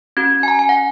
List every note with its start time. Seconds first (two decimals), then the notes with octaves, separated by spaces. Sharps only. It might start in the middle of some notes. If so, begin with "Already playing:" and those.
0.17 C#4 F#4 G#6
0.43 G#5
0.48 A#5
0.59 G#5
0.69 F#5